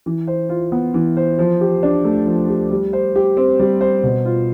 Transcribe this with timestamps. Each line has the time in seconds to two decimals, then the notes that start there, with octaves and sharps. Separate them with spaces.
0.06 E3
0.27 C5
0.49 F4
0.72 B3
0.94 E3
1.17 C5
1.39 F3
1.61 G4
1.83 D4
2.04 A3
2.26 F3
2.48 G4
2.70 G3
2.93 C5
3.16 G4
3.37 C4
3.59 G3
3.81 C5
4.03 B2
4.25 F4